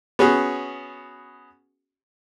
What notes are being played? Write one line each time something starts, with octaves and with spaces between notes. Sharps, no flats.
B3 C#4 F#4 G#4